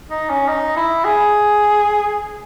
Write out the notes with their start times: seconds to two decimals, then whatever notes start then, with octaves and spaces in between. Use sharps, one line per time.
0.10 D#4
0.30 C#4
0.48 D#4
0.76 E4
1.05 G#4